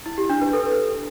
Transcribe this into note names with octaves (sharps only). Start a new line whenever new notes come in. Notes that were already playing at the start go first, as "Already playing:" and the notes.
E4
G4
D4
B4
A4